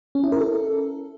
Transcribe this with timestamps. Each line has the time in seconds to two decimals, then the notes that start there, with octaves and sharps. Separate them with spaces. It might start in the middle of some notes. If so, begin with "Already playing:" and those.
0.15 C#4
0.24 E4
0.32 A#4
0.41 A4